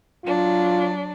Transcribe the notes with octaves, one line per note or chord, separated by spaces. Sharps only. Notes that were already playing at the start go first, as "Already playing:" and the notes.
F#3 D4 F4